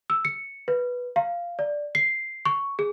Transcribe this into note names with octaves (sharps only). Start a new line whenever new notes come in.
E6
C#7
B4
F5
D5
C7
C#6
G#4